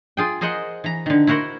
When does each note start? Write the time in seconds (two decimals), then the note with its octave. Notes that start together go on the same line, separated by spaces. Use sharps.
0.17 F4 G#4 G5
0.41 G#4 A#4 C5 D#5 F#5
0.84 E3 A#5
1.06 D3 D#3
1.27 E4 F#4 A#4 C5 F#5